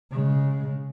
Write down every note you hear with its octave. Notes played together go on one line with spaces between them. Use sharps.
C#3 G#3